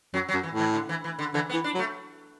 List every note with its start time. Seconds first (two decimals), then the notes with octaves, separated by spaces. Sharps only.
0.14 F#2 F#3
0.29 F#3
0.34 F#2
0.43 E3
0.54 A2
0.59 E3
0.74 D3
0.89 E3
1.04 E3
1.19 D3
1.34 D3 E3
1.50 B3
1.54 E3
1.64 D4
1.75 F#3
1.79 A3